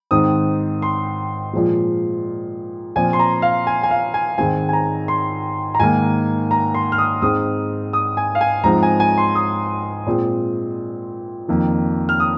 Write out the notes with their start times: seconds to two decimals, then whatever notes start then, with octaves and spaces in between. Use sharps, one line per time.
0.11 G#2 D#3 C4 D#6
0.82 C6
1.53 A#2 F3 G#3
2.96 A#2 F3 C4 G#5
3.13 C6
3.19 A#5
3.42 F5
3.67 G#5
3.83 G#5
3.91 F5
4.14 G#5
4.38 G#2 D#3 G#3 C4 G#5
4.69 G#5
4.73 A#5
5.08 C6
5.75 A#5
5.79 G#2 D#3 A#3 G#5
6.51 A#5
6.74 C6
6.92 F6
6.98 D#6
7.22 G#2 G#3 C4 D#6
7.93 D#6
8.17 G#5
8.35 F5
8.41 G#5
8.64 G#2 F3 G#3 C4 A#5
8.83 G#5
9.00 G#5
9.18 C6
9.35 D#6
10.07 A#2 G#3 C4
11.48 F2 D#3 A#3
12.09 F6
12.20 D#6